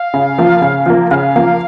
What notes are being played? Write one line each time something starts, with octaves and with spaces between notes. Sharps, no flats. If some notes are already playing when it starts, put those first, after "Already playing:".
Already playing: F5
C#3
F3 A#3
C#3
F3 A#3
C#3 F5
F3 A#3